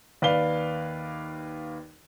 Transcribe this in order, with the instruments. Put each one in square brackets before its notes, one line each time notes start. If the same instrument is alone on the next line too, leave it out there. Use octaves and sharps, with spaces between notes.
[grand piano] D#2 B4 D5 F5 G7